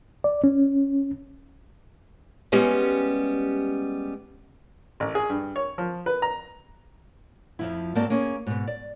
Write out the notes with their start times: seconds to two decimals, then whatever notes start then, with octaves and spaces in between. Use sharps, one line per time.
0.24 D5
0.44 C#4
2.52 G3 G#3 B3 C#4 G4
5.00 A1
5.15 G#4
5.29 G2
5.56 C#5
5.78 F3
6.06 B4
6.22 A#5
7.59 F2 F3 E4
7.95 G#2 A#3 C4 F#4 D5 A5
8.10 A#3 C#4 G#4
8.47 G#2 B2
8.67 D5